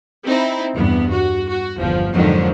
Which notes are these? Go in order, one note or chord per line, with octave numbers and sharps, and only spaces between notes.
C4 D#4 E4
E2 G2 B3
F#4
F#4
G1 E2 F3
F2 G#2 D3 D#3 F3 F#3